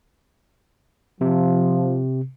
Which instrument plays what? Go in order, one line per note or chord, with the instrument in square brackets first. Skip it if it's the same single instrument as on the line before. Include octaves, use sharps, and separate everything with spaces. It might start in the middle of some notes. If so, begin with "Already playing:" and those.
[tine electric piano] C3 [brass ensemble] F3